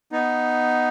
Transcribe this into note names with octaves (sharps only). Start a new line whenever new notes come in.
B3 D#4